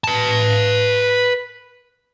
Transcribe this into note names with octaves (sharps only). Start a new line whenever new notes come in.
B4 A5